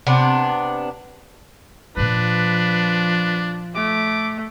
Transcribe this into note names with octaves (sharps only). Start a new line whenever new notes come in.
C3 B3 D4
A#2 F3 D4 F4 B4
A3 D6